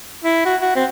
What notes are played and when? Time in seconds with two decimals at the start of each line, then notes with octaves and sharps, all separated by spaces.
0.24 E4
0.45 F#4
0.62 F#4
0.75 C4